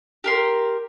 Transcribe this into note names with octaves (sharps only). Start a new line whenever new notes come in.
G4 A#4 C6